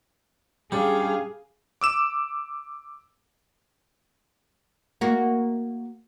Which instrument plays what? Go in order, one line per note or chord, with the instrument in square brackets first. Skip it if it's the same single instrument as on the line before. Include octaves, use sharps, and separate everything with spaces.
[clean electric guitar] G3 C#4 D4 [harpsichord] G4 [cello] G#4 F5
[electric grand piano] D6 E6 E7
[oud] A#3 F#4